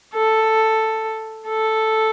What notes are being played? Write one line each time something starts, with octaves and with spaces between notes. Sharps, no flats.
A4
A4